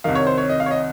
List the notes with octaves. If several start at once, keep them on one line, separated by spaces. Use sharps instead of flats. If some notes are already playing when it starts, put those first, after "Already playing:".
C2 C3 D#3 F5
C#5
C5
C#5
D#5
F5
C#5
D#5